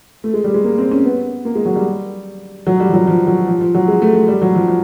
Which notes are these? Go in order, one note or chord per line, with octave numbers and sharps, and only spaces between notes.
A3
G#3
G3
G#3
A#3
C4
C#4
B3
A#3
G#3
F#3
G3
F#3
G3
F3
F#3
F3
F#3
F3
F3
F#3
G#3
A3
A3
G3
F#3
F3
F3